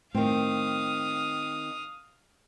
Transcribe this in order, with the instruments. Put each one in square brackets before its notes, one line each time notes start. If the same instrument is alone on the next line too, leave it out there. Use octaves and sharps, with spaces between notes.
[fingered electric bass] A2 [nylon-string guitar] D#3 C4 [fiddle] F5 D#6